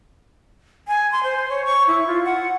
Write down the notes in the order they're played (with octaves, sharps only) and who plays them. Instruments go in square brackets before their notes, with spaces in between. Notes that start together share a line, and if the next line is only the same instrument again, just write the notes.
[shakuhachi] G#5
C6
C5
C#5
C#6
E4
F4
F#5